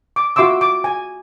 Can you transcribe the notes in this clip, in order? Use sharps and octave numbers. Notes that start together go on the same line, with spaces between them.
D6
F4 F#4 E5 C6 D6 E6
D6
G#5